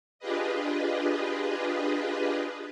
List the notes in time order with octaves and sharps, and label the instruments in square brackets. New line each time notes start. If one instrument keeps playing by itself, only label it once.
[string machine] D4 F4 G4 G#4 B4 D#5